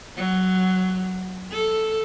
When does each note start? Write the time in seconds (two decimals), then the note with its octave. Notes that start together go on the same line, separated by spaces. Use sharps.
0.16 F#3
1.52 A4